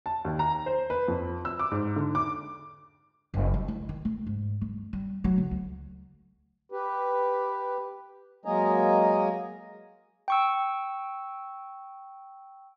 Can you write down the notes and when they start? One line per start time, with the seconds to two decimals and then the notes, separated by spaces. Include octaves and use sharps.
0.06 A5
0.25 D#2
0.39 A#5
0.66 C5
0.90 B4
1.08 F2
1.45 E6
1.59 D6
1.71 G#2
1.96 D3
2.15 D6
3.34 F#1
3.54 G3
3.68 E4
3.89 D#3
4.05 A3
4.27 G#2
4.61 G2
4.93 G3
5.24 F#3
5.38 D3
5.51 D2
6.72 G4 B4
8.45 F#3 G#3 A#3 D#5 G#5 A#5
10.28 G5 C#6 E6